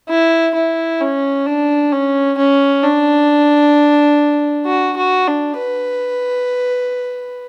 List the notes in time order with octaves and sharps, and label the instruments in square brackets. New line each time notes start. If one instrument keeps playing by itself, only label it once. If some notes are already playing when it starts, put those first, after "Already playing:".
[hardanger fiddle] E4
E4
C#4
D4
C#4
C#4
D4
F#4
F#4
D4
B4